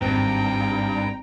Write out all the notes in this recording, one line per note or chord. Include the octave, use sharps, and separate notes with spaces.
G#1 G2 G5 A#5